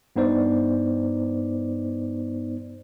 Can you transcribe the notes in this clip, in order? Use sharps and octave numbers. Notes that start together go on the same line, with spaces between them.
G2 B3 D#4 C5 D5